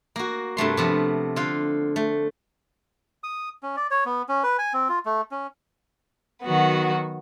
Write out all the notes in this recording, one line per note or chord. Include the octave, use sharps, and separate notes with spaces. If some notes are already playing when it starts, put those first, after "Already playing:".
A#3 F#4
G2 C3 A3 C6
C3 F3 B3
D3 F4 F5
A3
D#6
C#4
D5
C#5
B3
C#4
B4
G#5
C4
F4
A3
C#4
D#3 F#3 B3 F#4